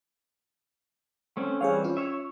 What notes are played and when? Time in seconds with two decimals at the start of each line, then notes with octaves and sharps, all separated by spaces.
1.37 A3 C4 C#4
1.61 E3 G3 C4 G#4 C#5 F5
1.84 C#4 F4
1.97 C#5 E5